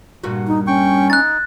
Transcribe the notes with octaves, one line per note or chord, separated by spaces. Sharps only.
G2 A#2 F#4
D#4
C#4 G5 C#6
D#4 F#6 A6